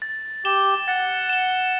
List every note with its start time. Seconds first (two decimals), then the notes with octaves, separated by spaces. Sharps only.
0.02 A6
0.45 G4 E7 G7
0.87 F#5 A6
1.30 E7 G7